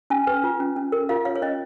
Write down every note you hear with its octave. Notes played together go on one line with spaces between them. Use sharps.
C#4 G#5
B4
F4
C#4
C#4
A#4
F4 F5
C#5 F5
C#5
C#4 D#5